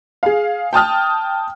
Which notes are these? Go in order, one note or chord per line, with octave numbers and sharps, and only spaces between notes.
G#4 F5
G5 A5 D#6 F6